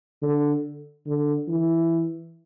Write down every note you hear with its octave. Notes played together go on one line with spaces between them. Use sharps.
D3
D3
E3